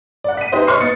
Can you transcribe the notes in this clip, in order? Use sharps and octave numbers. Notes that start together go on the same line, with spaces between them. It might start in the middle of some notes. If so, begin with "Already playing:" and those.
D5 F#5
B6 D#7
D#4 G4 B4 C5 D#5 E5
C#5 C6 C#6 F6 C7
B3 D#5 A6 C#7